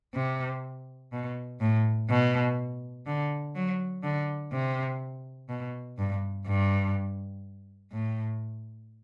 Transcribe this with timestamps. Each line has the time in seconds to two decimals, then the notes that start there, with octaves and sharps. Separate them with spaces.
0.15 C3
1.12 B2
1.60 A2
2.09 B2
3.06 D3
3.55 F#3
4.03 D3
4.52 C3
5.49 B2
5.98 G2
6.47 G2
7.92 A2